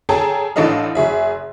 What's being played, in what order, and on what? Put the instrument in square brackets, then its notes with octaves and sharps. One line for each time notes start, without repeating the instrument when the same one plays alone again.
[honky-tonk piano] G#4 A4 C#5 G5 A5 A#5
A1 A2 D4 A4 D#5 F5
F#1 G#4 E5